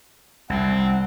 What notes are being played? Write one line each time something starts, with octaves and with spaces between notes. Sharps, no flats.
C2 C4 F#5